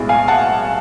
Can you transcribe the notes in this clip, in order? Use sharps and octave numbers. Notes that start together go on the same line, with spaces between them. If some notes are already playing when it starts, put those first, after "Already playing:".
Already playing: B1 A2 G#3 B3
F5 G#5
F#5 A5